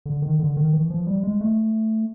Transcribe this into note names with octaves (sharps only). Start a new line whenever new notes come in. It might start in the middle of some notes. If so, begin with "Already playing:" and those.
D3
D#3
D3
D#3
E3
F3
G3
G#3
A3